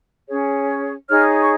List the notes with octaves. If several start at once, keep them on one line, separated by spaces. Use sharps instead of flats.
C#4 G#4 C#5
D#4 G#4 C#5 F6
C#6